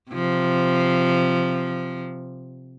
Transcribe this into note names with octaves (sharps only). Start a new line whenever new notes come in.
C3 F3